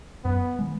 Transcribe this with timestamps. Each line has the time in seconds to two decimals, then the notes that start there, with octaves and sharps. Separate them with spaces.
0.24 F#2 B3
0.59 D#3 G#3